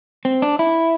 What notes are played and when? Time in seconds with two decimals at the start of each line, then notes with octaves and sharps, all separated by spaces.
0.25 C4
0.42 D4
0.59 E4